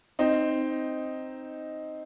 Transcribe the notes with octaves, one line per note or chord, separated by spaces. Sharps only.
C4 D#4